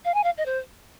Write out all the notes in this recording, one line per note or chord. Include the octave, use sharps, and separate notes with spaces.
F5
G#5
F5
D#5
C5